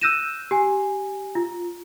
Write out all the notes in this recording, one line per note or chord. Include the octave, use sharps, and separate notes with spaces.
E6 F#6 G6 A#6 D#7 E7
G4 G#5
F4